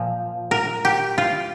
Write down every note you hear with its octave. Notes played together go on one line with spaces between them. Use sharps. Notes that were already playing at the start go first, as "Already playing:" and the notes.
Already playing: A#2 F3
A#4
G4
F4